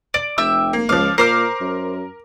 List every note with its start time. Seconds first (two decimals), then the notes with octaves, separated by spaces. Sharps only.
0.14 D5 D7
0.38 F1 G4 E5 E6
0.73 A#3
0.89 C#2 F3 F5 D6
1.18 A#2 A#4 C5 D6 F6
1.61 F#2